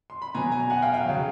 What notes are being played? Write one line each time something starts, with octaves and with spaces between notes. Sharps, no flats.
C6
B5
B2 F#3 G#5 A#5
G#5 A#5
F#5 G#5
F5 G5
F5 G5
C#3 F#3